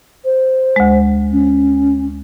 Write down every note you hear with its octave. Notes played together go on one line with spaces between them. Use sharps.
C5
D2 G#3
C#4